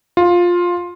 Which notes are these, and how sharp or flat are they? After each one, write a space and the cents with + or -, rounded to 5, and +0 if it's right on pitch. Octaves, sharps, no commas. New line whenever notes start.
F4 +10